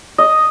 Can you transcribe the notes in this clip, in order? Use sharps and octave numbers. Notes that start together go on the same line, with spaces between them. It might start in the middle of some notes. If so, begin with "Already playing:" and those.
D#5